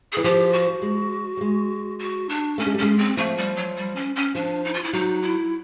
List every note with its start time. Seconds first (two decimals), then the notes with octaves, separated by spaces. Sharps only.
0.12 E3 G#4
0.24 F3 G4
0.53 F#4
0.82 G#3
1.37 G3
1.41 G#3
1.99 F#4
2.29 D4
2.58 A3 C#4
2.67 G#3
2.74 G3
2.78 G#3 C#4
2.98 C4
3.17 F3 A3
3.37 G3
3.57 F#3
3.76 G3
3.96 C#4
4.16 C#4
4.35 F3 D4
4.64 D#4
4.74 F4
4.84 E4
4.93 F#3 D#4
5.22 E4